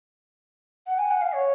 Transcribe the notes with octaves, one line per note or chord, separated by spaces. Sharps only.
F#5
G#5
F#5
F5
C#5